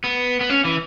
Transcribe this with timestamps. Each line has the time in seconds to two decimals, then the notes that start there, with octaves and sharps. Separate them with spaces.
0.04 B3
0.41 B3
0.49 C#4
0.65 E3